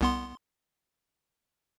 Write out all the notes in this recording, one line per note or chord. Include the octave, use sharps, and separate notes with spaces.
C2 B3 C6